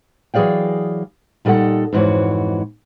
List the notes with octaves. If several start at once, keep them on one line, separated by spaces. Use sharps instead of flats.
E3 F#3 G#4 D5 F5 G5
A#2 G3 D#4 A4 F#5
F2 G#2 E3 F#4 C#5